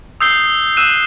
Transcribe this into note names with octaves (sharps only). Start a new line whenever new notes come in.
D#6 E6 G6 C7 G7
E6 F#6 D#7 E7